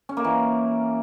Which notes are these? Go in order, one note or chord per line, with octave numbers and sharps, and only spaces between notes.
C#4
A#3
E3